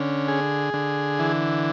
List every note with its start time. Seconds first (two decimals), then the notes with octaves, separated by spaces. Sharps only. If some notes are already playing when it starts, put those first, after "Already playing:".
Already playing: D3 C#4
0.28 G#4
0.74 D3
1.19 E3